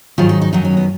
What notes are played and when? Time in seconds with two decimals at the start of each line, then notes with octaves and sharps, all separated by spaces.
0.18 G#2 D#3 F#3 F4
0.29 D#4
0.42 D#4
0.53 F#2 D#3 F#3 D#4
0.65 C#4
0.77 B3